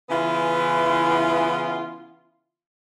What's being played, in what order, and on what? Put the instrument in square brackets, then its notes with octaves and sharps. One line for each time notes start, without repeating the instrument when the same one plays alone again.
[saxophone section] C#3 E3 B3 E4 F4